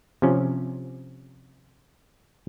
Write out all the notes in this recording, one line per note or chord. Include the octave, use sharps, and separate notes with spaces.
C3 F3 C#4